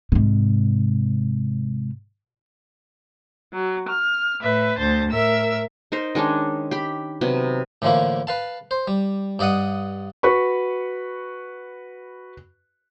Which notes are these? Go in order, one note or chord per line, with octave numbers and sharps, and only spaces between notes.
G#2 C3
F#3
F6
A2 B4 E5
D2 C5 A5
A2 A#4 E5 E6
D#4 A#4 C5
D#3 G#3 C#4 D4
G4 B5
C3 F#3 B3
A2 D3 E3 F3 A#3 E4
B4 F5 A5
C5
G3
G2 D5 D#5 F#5 D#6
F#4 B4 B5 C#6